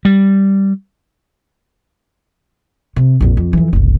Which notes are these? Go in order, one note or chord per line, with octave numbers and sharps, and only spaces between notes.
G3
C3
A#1 F2
F2
F2 E3
F#1 C2